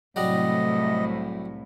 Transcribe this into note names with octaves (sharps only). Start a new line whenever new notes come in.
C2 A2 F#3 G3 D#5 F#5